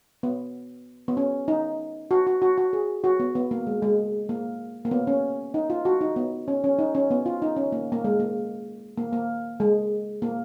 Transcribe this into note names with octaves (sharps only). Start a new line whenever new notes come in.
B3
B3
C#4
D#4
F#4
F#4
F#4
F#4
G#4
F#4
B3
B3
A#3
G#3
G#3
A#3
A#3
B3
C#4
D#4
F4
F#4
D#4
B3
C#4
C#4
D#4
C#4
B3
F4
D#4
C#4
A#3
A#3
G#3
A#3
A#3
A#3
G#3
A#3